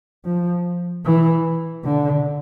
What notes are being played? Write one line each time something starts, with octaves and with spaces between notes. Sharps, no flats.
F3
E3
D3